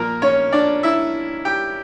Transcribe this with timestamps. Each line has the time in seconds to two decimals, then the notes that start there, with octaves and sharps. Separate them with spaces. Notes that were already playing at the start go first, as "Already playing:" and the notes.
Already playing: A#2 F3 A#3 A#4
0.22 C#4 C#5
0.52 D4 D5
0.83 E4 E5
1.45 G4 G5